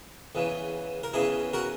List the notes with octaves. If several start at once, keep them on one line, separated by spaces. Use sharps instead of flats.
E2 C#3 E3
A#4
E2 C#3 E3 E4 G#4
F#4 A#4